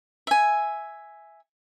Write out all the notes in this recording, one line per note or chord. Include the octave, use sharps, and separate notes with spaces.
E5 G#5